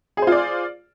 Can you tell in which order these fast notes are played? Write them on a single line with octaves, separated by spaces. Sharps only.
G#4 C5 F4 D5